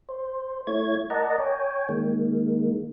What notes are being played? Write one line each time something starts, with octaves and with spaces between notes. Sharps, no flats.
C5
A3 E4 C#5 G#6
A#4 D5 D#5 F#5 A5 A#5
C#5 G5 G#5
D#3 G#3 A#3